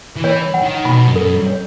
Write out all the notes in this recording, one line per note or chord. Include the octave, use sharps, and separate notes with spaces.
E3
C#5
F#5
D#3
B2 B5
F#2
A4
C#5